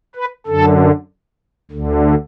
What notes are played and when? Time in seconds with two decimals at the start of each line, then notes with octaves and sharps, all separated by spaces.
0.15 B4
0.47 F#2 D3 A4
1.71 D2 D3